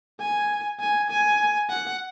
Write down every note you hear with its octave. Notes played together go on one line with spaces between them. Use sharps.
G#5
G#5
G#5
F#5